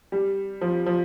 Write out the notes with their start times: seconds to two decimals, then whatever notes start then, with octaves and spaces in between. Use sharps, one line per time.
0.12 G3
0.61 F3
0.86 F3